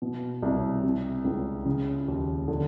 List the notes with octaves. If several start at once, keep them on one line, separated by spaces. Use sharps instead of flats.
B2
C2
C3
C#2
C#3
D#2
D3